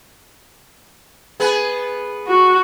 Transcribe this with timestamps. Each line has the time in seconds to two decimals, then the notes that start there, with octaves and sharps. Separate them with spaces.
1.40 B3 G#4 B4
2.28 F#4